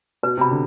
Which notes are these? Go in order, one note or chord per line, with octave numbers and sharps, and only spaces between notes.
B2 B4
C3 B5
D3